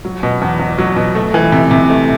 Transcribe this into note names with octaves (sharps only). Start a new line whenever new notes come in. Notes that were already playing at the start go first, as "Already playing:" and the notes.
F#3
B2
E2
E2
F#3
B2
A3
E3
C3
C3
A3